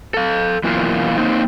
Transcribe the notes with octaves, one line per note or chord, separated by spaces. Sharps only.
A4 F5
F#2 B2 E3 A#3 F4 F5
A#3 C4 D#4